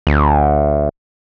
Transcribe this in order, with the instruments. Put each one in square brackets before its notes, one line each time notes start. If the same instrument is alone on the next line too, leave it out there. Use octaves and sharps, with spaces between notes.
[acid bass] D2